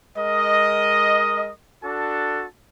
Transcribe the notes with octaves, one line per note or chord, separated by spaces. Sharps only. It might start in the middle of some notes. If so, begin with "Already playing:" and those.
G#3 A#4 D#5
D4 F#4 A4 A5